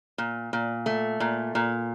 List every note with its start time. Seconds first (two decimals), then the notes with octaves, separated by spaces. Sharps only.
0.18 A#2
0.53 A#2
0.86 A3
1.20 A#2
1.55 A#2